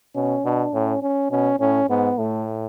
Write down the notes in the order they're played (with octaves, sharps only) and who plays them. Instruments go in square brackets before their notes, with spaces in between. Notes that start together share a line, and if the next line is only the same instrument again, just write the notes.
[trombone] B2 [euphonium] C#4
[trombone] B2 [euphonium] D4
[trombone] A2 [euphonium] C#4
[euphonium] C#4
[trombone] B2 [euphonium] C#4
[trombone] A2 [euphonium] C#4
[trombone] G#2 [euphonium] B3
[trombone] A2 [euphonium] A3